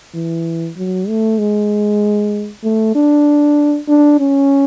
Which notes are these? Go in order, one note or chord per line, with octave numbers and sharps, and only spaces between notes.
E3
F#3
A3
G#3
A3
D4
D4
C#4